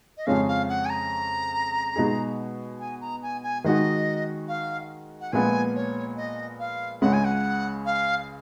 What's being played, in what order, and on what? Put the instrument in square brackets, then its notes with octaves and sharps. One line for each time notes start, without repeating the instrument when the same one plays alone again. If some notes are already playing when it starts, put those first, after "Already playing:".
[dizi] D#5
[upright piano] F2 C#3 F3 G#3 C#4 [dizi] F5
[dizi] F5
F#5
G#5
A#5
[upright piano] B2 G#3 D#4 G#4
[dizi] G#5
A#5
G#5
G#5
[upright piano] D#3 G#3 D#4 F#4 [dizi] D#5
[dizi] F5
F#5
[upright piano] A#2 F3 G#3 B3 F4 [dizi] G#5
[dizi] C#5
D#5
F5
[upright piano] C#2 C#3 G#3 [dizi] F#5
[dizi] G#5
F#5
F5